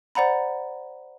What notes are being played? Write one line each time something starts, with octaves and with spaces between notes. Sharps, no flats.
C5 D5 F#5 A#5 B5